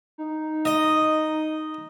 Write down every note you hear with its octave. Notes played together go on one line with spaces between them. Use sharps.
D#4
D#5